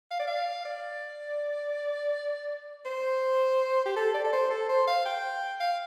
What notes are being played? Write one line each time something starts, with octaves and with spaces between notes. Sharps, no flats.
F5
D5
F5
D5
C5
G4
A4
D5
A4
C5
A4
C5
F5
G5
F5